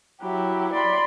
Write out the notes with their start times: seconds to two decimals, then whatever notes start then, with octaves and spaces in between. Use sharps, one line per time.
0.20 F#3 E4 G4
0.71 D5 B5 C6